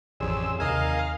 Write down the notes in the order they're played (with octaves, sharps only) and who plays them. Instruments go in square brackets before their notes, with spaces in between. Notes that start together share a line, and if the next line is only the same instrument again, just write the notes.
[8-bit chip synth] A1 F2 [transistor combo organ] G#4 E6 [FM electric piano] C#5 D5 C6
[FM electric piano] D#2 C3 D#4 [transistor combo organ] A#4 [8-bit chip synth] D#5 G#5 [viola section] F5